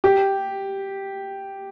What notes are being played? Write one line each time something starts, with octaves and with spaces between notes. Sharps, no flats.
G4